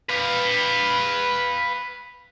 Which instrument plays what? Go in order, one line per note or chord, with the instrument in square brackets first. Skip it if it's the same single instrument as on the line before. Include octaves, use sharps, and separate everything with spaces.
[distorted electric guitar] B4 F5